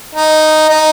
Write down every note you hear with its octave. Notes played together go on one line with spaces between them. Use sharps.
D#4
D#4